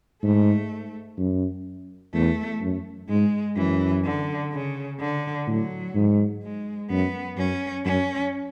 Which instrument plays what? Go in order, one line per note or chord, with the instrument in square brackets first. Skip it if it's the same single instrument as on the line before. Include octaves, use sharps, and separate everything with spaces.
[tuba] G#2 [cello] A3
[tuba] F#2
[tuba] E2 [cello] A3
[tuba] F#2
[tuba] G#2 [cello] G#3
[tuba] F#2 [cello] E3
[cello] D3
C#3
D3
[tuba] A2 [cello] F#3
[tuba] G#2
[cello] G#3
[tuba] F#2 [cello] B3
[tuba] F#2 [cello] C#4
[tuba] F#2 [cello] C#4